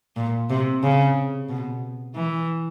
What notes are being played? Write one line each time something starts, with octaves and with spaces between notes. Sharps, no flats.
A#2
C3
C#3
B2
E3